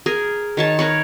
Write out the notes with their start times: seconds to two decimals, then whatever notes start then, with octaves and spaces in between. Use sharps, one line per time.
0.06 G#4 A#4
0.57 D#3 C#5 A5
0.79 A#4 B4 C#5